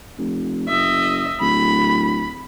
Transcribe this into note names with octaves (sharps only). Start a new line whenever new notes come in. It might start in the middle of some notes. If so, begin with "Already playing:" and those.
F1
F#1 D#5 E5
D1 B5